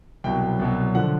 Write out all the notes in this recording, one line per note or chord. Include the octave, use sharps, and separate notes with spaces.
C2 B2 F#3 G5
C2 B2 F#3
D3 F3 F#5